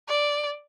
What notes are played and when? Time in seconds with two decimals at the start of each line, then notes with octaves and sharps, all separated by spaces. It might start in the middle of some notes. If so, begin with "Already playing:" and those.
0.09 D5